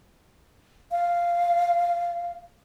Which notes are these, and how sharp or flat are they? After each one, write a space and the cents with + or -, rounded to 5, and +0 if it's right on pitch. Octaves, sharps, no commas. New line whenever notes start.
F5 -10